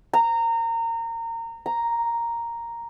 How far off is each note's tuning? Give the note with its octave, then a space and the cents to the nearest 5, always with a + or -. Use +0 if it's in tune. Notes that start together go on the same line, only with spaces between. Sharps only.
A#5 -25
A#5 +0